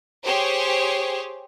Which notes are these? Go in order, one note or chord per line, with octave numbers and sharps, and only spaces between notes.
G4 G#4 C5 C#5